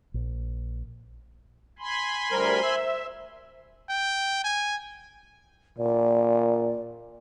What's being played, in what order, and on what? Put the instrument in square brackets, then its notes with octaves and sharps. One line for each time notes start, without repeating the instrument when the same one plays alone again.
[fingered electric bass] A#1
[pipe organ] G#5 B5 C6
[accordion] D2 G3 A#4 [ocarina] C5
[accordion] E5
[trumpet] G5
G#5
[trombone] A#2 [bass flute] D5